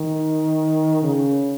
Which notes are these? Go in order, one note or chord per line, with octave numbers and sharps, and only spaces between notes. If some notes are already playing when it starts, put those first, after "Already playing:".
Already playing: D#3
C#3